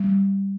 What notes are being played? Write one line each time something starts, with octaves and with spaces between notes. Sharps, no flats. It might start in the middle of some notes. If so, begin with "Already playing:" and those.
Already playing: G3